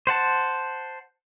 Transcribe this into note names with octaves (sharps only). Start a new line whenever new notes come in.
C5 F#5 A5